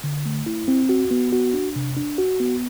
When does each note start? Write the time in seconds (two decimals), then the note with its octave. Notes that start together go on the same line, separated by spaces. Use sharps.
0.04 D3
0.26 A3
0.46 E4
0.68 C4
0.89 F#4
1.11 B3
1.32 F#4
1.53 D4
1.76 C3
1.97 D4
2.18 F#4
2.40 B3